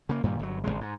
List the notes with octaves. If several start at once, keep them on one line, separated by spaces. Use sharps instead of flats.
C#3 A#3
G2 A#2 D#3 G3
G1 C3 F#3
G#1 D#2 C#3 G#3
G#2